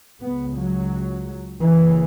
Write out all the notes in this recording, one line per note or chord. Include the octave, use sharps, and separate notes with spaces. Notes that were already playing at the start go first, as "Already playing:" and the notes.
C#2 C#3 B3
F#3
F#1 F#2 C#3 E3